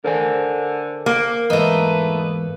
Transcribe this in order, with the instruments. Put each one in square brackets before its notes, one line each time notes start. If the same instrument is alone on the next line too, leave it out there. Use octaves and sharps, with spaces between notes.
[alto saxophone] D3 [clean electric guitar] A#4 C5 G#5
[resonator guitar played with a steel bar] A#3
[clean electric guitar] E2 G#2 [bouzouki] A3 D#4 [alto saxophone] B4